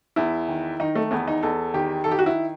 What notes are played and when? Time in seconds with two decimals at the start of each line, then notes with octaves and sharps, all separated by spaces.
0.16 E2 E4
0.48 D#3
0.80 D#3 D#4
0.95 A3
1.11 E2 B3
1.27 D#4
1.43 E2 A4
1.74 D#3 G4
2.04 D#3 A4
2.11 G4
2.19 F#4
2.26 E4